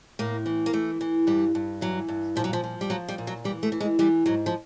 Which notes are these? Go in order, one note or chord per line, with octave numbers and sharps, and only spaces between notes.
A2 A#3
E3
A#3
E3 A3
E3
G2 G3
G2
E3 F#3
G2
A#2 F3
F#3
F3
F3
G3
F3 F#3
G3
A#2
F#3
E3 G3
A3
E3
G#3
E3 G3
G#2 F#3
F3